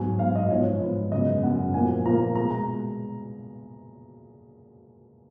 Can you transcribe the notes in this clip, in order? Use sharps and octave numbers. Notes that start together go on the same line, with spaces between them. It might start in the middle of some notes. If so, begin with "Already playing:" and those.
Already playing: G#2 F#3 B3 G#5
G#2 F#3 B3 F5
D#5
G#2 F3 B3 C#5
G#2 F3 B3
F#2 C#3 G#3 B3 D#5
F#2 C#3 G#3 B3 F#5
A#2 F3 A#3 G#5
A#2 F3 A#3 A#5
B2 G#3 B3 A#5
A#5